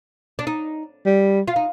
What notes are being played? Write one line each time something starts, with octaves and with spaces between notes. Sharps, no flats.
D4
D#4
G3
F4
D#4